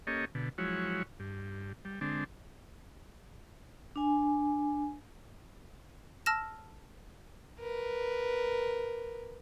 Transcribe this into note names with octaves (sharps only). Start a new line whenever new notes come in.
A#3 C#4 G4 A4 C#5 D#5
B2 D3
F3 F#3 G#3 E4 F#4 C#5
G2
G3
D3 G#3 C4 D4
D4 G#5
A5 E6 F6 A#6 E7
A#4 B4